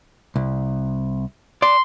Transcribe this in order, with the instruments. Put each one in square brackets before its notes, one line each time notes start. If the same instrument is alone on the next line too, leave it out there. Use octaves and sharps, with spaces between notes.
[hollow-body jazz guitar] C2
[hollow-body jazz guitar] D5 [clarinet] C6